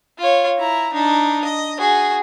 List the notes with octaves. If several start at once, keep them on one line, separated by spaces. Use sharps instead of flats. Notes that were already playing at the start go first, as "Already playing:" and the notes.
F4 C#5
E4 A#5
D4 D#4
D#5
F#4 G#4